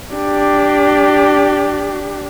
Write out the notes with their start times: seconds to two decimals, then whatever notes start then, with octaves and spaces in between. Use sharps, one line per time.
0.14 D4 G4